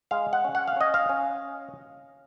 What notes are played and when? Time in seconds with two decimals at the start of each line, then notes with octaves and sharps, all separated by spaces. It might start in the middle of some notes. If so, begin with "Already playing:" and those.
0.11 G#3 F5
0.33 F#5
0.44 C#4
0.55 F#5
0.68 F5
0.76 C#4 D#5
0.94 F5
1.09 C#4